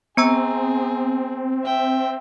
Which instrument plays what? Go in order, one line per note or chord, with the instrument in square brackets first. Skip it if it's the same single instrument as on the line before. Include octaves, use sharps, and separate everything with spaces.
[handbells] B3 A#5 E6 [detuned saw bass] C4 [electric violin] G#4
[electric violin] E5 G5